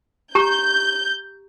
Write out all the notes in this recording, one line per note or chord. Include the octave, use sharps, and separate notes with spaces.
G4 A#5 C#6 G6